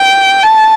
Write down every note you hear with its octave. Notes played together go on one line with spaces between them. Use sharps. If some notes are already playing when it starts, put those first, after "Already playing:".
Already playing: G5
A5